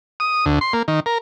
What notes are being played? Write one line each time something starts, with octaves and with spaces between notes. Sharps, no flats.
D#6
D2
C6
A#3
D#3
A#4